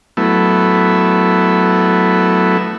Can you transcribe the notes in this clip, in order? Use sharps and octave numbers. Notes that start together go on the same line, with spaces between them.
F#3 A3 B3 E4